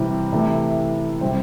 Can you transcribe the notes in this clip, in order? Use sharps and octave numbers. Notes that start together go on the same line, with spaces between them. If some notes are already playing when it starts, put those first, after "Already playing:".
Already playing: C3 E3 G3 C4
C3 E3 A3 E4
C3 G3 C4